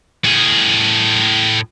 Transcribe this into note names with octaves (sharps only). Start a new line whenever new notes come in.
A2 G#4